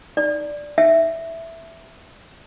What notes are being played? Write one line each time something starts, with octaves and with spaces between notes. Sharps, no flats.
D5
E5